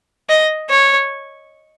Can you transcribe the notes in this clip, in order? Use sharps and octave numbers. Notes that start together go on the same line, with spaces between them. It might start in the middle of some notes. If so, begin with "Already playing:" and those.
D#5
C#5